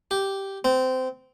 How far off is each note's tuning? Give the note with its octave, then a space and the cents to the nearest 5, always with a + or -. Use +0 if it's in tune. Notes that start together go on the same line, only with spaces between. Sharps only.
G4 -5
C4 -20